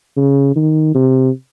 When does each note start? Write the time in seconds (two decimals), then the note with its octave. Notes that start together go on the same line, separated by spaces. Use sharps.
0.17 C#3
0.56 D#3
0.95 C3